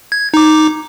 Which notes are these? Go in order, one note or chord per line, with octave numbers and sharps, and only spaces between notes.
G#6
D#4 D6